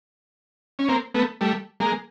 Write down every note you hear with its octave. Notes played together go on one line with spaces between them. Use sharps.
C#4
A#3 C4
A3 B3
G3 A3
G#3 A#3